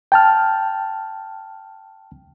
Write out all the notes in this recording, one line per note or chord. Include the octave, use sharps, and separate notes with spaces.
G5 A5 F6